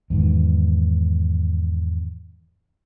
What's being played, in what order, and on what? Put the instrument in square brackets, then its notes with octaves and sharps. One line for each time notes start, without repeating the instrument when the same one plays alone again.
[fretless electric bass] E2 G#2 D#3